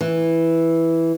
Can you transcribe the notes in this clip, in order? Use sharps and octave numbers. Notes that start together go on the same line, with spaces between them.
E3